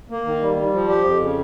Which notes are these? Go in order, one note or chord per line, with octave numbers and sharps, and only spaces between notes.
A#3
D#3
G3
G3
F3
G4
F2
C#3